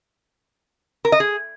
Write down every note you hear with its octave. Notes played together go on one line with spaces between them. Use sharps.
A#4
D#5
G#4